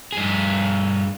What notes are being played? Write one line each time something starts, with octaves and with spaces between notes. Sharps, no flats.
G2 G#4